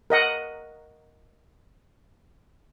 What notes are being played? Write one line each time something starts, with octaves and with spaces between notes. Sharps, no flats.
A#4 D#5 F#5